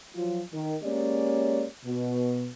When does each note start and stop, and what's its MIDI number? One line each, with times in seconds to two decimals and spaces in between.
0.15 0.42 53
0.15 0.42 54
0.15 0.42 65
0.53 0.75 51
0.83 1.65 56
0.83 1.65 58
0.83 1.65 61
0.83 1.65 67
0.83 1.65 73
0.83 1.65 74
1.85 2.48 47